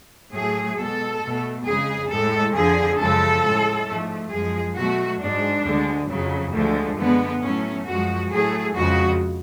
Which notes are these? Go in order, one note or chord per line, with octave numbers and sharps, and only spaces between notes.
A2 F#3 A3 G#4
B2 G#3 A4
B2 A3
F2 C#3 G#3 G#4
A2 G#3 A4
F2 D3 F3 G#4
F#2 C#3 F3 G#3 A4
A2 G#3
G#2 F3 A3
F#2 F3 G#3 G#4
B2 F#3 A3 F#4
G#2 G#3 D4
D2 D3 G#3
F2 C#3 F#3
D2 D3 F3 G#3 A3
F#2 D3 G#3 B3
A2 F#3 A3 C#4
F#2 F3 G#3 F#4
A2 F#3 A3 G#4
F2 C#3 F3 G#3 F#4